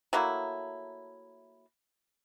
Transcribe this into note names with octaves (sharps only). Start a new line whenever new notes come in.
F#3 A3 A#3 E4